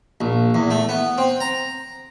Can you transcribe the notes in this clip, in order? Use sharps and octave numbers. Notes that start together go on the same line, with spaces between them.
A#1
E2
A3
B3
C4
A#5